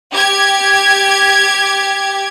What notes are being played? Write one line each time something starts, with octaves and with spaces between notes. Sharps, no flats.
G4 G#6